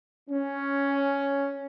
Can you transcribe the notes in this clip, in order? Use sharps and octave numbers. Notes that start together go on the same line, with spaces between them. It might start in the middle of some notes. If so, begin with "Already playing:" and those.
C#4